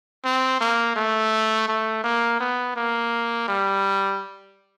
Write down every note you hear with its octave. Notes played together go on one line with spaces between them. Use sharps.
C4
A#3
A3
A3
A#3
B3
A#3
G3